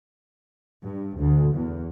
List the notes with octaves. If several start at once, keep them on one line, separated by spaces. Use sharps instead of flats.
G2
D2
E2